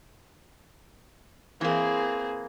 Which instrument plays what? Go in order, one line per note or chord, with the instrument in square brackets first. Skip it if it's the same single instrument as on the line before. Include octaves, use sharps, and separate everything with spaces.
[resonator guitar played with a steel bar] E3 A#3 [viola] C4 G#4